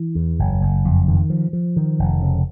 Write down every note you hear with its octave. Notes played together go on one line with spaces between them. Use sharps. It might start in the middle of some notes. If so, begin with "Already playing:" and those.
Already playing: E3
E2
F#1
F#1
F2
D#3
F3
F3
D#3
F1
C#3